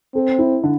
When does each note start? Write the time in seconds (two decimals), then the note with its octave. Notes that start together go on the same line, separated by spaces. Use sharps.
0.15 C4 A4
0.39 E4
0.64 D3